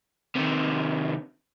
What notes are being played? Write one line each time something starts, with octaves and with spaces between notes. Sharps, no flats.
C3 D#3